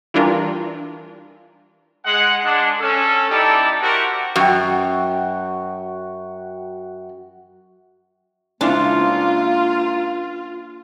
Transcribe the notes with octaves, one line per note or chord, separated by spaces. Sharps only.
E3 G3 D4 F4 A#4
G#3 F#5
G#3 D4
C#4 A4
G3 D#4 E4 G4 D5 A5
E4 F#4 G4 A#4 C5 D5
F#2 F#4 G5
C#2 A#3 D4 E4 F4 C5